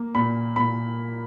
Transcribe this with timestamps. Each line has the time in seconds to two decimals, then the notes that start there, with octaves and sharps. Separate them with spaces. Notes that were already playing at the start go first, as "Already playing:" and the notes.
Already playing: A#3
0.15 A#2 B5
0.56 A#2 B5